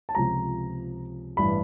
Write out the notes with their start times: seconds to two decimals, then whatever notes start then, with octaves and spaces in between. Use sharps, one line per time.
0.09 A5
0.15 C#2 C3 F3 A#5
1.37 A1 G2 E3 B5